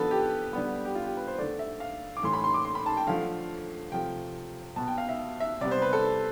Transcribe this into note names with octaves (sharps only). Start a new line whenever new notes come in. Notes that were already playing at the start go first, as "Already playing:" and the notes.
Already playing: D3 F3 B3 A4 B4
G4
D3 G3 B3
G4
F4
G4
B4
C5
D3 A3 D5
E5
F5
D6
A2 E3 A3 C6
B5
C6
D6
C6
B5
A5
G5
D3 F3 A3 F5
C3 F3 A3 G5
B2 B3 A5
G5
F5
E5
E5
C3 G3 B3 D5
C5
B4
A4